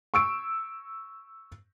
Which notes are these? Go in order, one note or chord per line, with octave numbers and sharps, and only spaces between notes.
C#6 E6 D7